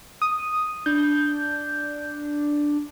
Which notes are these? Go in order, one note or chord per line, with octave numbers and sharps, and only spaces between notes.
D#6
D4 G6